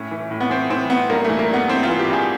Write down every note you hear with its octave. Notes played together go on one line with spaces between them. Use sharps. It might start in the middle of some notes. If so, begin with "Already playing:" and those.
Already playing: A2 C#4
E3
A2
B3
E3 C4
E3 C4
A2 B3
G2 A#3
E3 A3
A#3
G2 B3
E3 C4
F4
E3
G4
G2
G#4